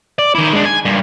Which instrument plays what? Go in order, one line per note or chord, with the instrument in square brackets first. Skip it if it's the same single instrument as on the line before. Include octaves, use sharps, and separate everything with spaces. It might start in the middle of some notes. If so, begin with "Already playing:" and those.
[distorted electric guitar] D5
D#3 E4
G#3 D4
G#5
G2 A#2